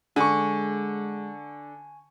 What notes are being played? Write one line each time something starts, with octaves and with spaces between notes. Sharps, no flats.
D3 G#3 G#5 C#6